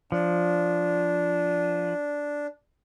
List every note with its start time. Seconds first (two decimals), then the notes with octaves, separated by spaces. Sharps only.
0.12 F3 D4